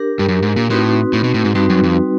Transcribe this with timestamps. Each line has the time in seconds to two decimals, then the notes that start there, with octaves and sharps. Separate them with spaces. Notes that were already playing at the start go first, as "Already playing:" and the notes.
Already playing: D4 G4 A#4
0.19 G2
0.28 F#2
0.42 G#2
0.56 A#2
0.70 A2 C4 D#4 F#4 B4
1.13 A2
1.24 B2
1.34 A2
1.45 G#2
1.55 G2 G3 C4 D#4 F#4 B4
1.70 F#2
1.84 F2